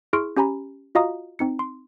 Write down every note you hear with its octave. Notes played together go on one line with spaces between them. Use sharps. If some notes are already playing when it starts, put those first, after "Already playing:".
E4 G#4 C6 C#6 F6 D7
C#4 G4 G#5 A#5 B5
F4 F#4 D#5 F5 A#5 D#6
C4 D#4 C#7
C6